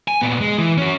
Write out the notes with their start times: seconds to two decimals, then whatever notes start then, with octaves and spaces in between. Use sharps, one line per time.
0.08 G#5
0.22 A#2 B3
0.41 G#3
0.58 E3
0.78 C#4 F#4